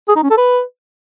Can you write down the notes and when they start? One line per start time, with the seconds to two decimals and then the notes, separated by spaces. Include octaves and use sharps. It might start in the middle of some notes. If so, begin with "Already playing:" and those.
0.08 G#4
0.16 D#4
0.23 C#4
0.30 A4
0.37 B4